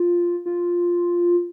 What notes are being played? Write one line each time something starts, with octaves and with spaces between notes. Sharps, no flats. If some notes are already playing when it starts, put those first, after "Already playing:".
Already playing: F4
F4